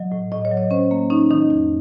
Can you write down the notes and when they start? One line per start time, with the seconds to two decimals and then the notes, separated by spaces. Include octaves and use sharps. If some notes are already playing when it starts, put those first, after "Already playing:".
Already playing: F#3 D#5
0.12 A2
0.32 A2 D#5
0.45 C#5
0.51 F#3
0.57 D#5
0.71 C#4 C5
0.91 A#3
1.10 C#4 D#4
1.31 D#3 D#4
1.50 F2 D#4